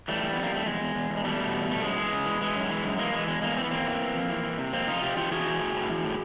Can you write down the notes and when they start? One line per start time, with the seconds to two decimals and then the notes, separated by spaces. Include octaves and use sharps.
0.08 E3 G3 A3
0.23 E3
0.33 F2 B3
0.43 A#3
0.51 F2 A3
0.66 E2 G#3
0.80 E2
0.95 E2
1.10 E2
1.17 G#3
1.24 B2 G3 A3
1.39 B2
1.53 E2
1.68 B2 A3
1.82 F#2 G#3
1.98 E3
2.12 C#3
2.26 E3
2.41 E3 G#3
2.56 F#2
2.70 E3
2.84 F#2
2.98 E3 G#3 A#3
3.13 E3 G#3
3.27 E2 G#3
3.42 E2 G#3 A#3
3.57 E3 C4
3.64 B3
3.71 E2 A#3 C4
3.86 E3
4.00 E3
4.15 F2
4.30 E3
4.44 E3
4.58 C3
4.73 F2 A#3 C4
4.88 F2 D#4 F4
5.02 C3 F4 G4
5.17 E3 F4 G4
5.31 E3 F#4 G#4
5.46 E3
5.60 A2
5.75 A2
5.90 E3
6.04 A2